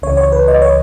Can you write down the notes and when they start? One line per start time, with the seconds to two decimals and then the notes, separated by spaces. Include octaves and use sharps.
0.02 C#2 C#3 E3 C#5
0.17 C#5
0.32 B4
0.48 D#5
0.62 C#5